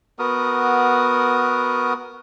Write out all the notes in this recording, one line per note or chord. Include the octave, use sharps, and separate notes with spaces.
B3 F#4 A#4 D#6